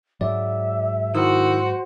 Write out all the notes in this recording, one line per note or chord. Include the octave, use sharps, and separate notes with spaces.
G#2 F#3 D5 E5
D#3 E4 F#4 C5 E6